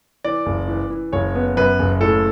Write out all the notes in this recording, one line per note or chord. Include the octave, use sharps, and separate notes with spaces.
E3 D5
F#1
E3
E3
F#1 C#5
B3
F#2 B4
F#1
A2 A4